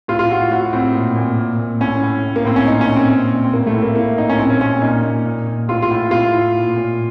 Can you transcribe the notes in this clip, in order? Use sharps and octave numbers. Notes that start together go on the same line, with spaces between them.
A2 F4
F4
A2 F#4
A2 F#4
A2 C4
A#2
A#2
A#2
A#2
A2 C#4
A2
A2
A#3
A2 C4
C#4
A#2 D#4
C#4
A#2
C4
A#2
A#2
C4
A2 A#3
A3
A2
A#3
A2 A#3
A2 D#4
C#4
A#2 C4
C#4
A#2 C#4
A#2 D#4
A#2
A#2
A#2
A2 F4
F4
A2
A2 F4
A2
A#2
A#2